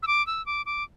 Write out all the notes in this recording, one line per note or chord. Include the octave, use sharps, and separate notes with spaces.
E6
D6
E6
D6
D6